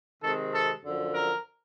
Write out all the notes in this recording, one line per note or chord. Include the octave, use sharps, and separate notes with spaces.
C3 D#3 G#3 C4 A4
A4
F#2 D3 F3
A#4